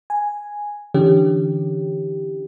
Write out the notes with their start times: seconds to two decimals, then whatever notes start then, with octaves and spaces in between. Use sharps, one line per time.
0.10 G#5
0.94 D3 E3 C#4 G4